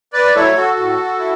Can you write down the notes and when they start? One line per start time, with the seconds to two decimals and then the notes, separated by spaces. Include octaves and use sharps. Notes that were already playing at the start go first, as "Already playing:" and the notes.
0.13 B4 D5
0.35 F#3 A3 E4 A4 C#5
0.55 F#4 A4
0.77 A2
1.19 E4